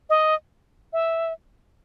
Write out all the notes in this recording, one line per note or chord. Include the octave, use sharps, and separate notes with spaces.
D#5
E5